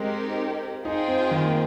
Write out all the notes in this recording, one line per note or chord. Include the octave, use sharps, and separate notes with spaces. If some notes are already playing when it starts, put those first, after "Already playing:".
Already playing: G#3 C4 D#4 G4 A#4
D#4 F4 G#4 C5 G5
C4
D#3
A#3